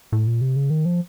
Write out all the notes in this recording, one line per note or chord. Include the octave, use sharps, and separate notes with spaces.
A2
A#2
C3
C#3
D#3
F3